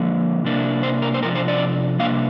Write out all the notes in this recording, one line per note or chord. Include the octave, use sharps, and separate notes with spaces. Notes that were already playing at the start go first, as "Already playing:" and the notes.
Already playing: D3 F3 A#3
C3 A#3 D4
C5
A#4
C5
C3 F3 D4 A#4
C5
D5
C3 A#3 D4 F5